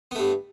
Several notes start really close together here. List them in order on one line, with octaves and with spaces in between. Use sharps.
B3 A3 G2